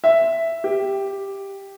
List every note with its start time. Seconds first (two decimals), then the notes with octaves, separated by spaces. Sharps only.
0.04 E5
0.64 G4